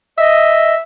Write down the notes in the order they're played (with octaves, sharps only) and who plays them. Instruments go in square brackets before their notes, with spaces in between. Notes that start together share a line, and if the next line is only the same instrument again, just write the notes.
[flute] D#5 [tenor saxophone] E5